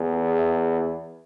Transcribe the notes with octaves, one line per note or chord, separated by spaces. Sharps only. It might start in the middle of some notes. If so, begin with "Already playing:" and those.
Already playing: E2
G#4
E5